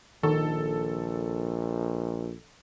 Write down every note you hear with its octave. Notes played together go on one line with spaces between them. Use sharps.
A#1 D#3 A4